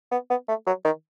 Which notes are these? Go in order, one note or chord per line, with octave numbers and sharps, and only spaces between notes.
B3
B3
A3
F#3
D#3